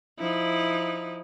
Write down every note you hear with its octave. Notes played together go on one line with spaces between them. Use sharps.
F3 D#4 E4